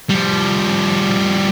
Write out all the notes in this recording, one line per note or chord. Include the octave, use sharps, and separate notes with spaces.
F3 G3